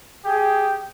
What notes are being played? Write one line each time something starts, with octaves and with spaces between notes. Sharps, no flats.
G4 G#4